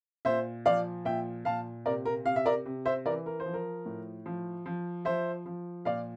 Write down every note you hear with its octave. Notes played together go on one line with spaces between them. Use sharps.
A#2 C5 E5
F3 D5 F5
A#2 E5 G5
A#2 F5 A5
C3 A#4 D5
A#4
C3 F5
E5
A#4 D5
C3
C5 E5
E3 A#4 D5
A#4
C5
F3
A#4
A2
F3
F3
F3 C5 E5
F3
A#2 D5 F5